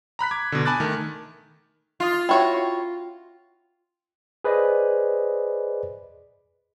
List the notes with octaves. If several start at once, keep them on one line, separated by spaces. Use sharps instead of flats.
A#5 B5 F#6 B6
D6 G#6
B2 D3
G#5 A5 B5 D6 F#6 A6
D#3 A3
F4 D#5 D#6
C#4 E4 F#4 C#5 F5 G5
G#4 B4 C5 D5 D#5